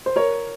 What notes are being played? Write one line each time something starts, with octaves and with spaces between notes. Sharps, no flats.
C5
A#4 C#5